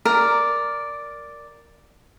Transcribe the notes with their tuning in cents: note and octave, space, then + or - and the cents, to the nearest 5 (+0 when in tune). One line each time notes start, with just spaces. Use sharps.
A#4 +0 D5 +0